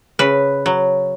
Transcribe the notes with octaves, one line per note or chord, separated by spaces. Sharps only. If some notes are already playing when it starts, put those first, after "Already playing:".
C#3 B4
F#3